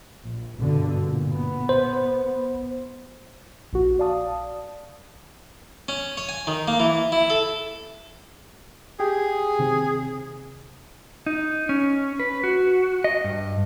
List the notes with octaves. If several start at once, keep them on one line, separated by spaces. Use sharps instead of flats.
A#1
G2 B2 D3
A#2
B3
C5
A#1 F#4
D5 F5 A5 D#6
C#4
C#5
G#5
D#3
A#3
E3
E4
A4
G4 G#4 G5
C3 D#3 C4
D#4
C#4
B4
F#4
D#5
G2